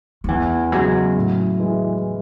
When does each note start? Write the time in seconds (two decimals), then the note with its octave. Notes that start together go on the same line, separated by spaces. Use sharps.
0.24 F#3
0.29 E2 E3
0.72 C#3 F#3 G#3
1.16 A2
1.60 E3 G#3